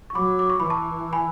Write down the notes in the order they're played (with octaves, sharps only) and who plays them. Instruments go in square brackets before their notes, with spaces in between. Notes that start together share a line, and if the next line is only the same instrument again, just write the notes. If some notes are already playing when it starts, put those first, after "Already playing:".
[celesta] C#6
[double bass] F#3 [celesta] B5 D6
[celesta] D6
C#6
[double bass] E3 [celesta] B5
[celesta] A5 C#6
G#5 B5